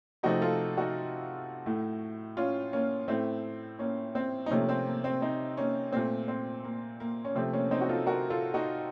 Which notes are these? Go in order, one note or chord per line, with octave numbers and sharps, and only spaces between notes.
C3 F3 A3 D#4 F#4
F4 A4
D#4 F#4
A2 A3
C#4 F4
A#3 C#4
A2 A3 C4
A#3 C#4
C4
D#4
C3 F3 A3 A#3 C#4
C4
A#3
C4
C4 D#4
A#3 C#4
A#2 A3 C4
C4
A#3
A#3
C#4
C3 F3 A3 C4
A#3 C#4
C4 D#4
F#4
F4 A4
F#4 A#4
F4 A4
D#4 F#4